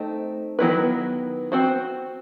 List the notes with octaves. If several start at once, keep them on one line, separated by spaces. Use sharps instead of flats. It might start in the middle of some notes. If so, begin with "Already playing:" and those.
Already playing: A3 C4 D#4
D#3 F#3 B3 E4 B4
C4 F#4 C5